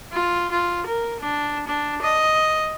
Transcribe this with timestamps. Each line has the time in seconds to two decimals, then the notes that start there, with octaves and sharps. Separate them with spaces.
0.13 F4
0.52 F4
0.87 A#4
1.20 D4
1.67 D4
2.02 D#5